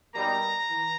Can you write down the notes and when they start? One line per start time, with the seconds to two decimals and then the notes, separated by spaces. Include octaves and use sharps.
0.13 B2 G3 A#3 D#4 A#5
0.69 E3